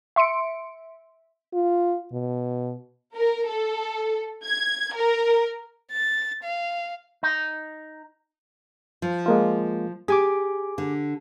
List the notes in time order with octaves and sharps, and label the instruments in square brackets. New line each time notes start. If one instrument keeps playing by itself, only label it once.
[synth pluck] E5 C6 C#7 D7
[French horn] F4
B2
[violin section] A#4
A4
G#6
A#4
[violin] A6
F5
[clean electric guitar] D#4
[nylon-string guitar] F3
[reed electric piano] G#3 A#3 F4
[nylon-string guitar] G4 [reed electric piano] G#4 G#5 D6
[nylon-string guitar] D3